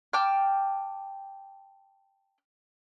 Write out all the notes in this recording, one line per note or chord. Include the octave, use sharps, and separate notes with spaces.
G5 A5 D6 F6